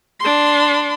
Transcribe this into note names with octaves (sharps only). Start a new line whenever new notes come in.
D4 C6